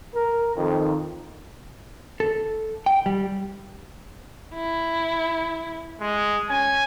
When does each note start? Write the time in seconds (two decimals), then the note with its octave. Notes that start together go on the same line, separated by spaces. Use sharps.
0.14 A#4
0.56 F2 D#3
2.20 A4
2.86 G5
3.06 G3
4.54 E4
6.01 G#3
6.50 C#4 G#5